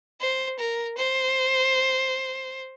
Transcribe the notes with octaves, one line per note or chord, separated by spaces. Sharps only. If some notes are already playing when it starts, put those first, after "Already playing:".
C5
A#4
C5